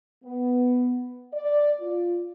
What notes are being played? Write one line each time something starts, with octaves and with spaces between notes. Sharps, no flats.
B3
D5
F4